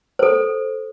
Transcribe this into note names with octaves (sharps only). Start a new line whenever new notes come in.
A4 C5